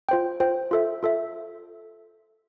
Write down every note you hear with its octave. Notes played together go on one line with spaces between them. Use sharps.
F4 C5 G5
F4 C5 G5
F4 A4 E5
F4 A4 E5